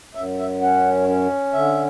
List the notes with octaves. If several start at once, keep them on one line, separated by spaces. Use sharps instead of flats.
F#2 E5
E5
C#4 F#5
C#4
D3 E5